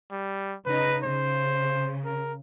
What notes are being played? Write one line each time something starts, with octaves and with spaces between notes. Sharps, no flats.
G3
C#3 D#4 B4 D#5
C#3 C5
A#4